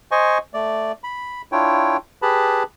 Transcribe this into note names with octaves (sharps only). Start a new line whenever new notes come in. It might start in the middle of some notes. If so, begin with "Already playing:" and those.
C5 D#5 G#5 C#6
A3 D5
B5
D4 E4 F4 C#5 G5
G4 G#4 B4 A5 B5